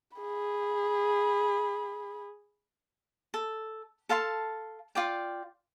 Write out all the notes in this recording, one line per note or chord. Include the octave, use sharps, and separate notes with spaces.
G#4 B5
A4
A4 F5 A5 C6
F4 D5 G5